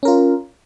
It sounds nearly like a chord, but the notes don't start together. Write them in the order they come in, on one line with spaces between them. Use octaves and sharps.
C#4 A#4 F4